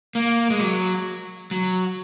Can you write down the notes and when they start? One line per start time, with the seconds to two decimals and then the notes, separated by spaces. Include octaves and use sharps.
0.15 A#3
0.50 G#3
0.60 F#3
1.51 F#3